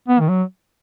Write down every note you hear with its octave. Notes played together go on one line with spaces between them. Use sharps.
B3
D#3
F#3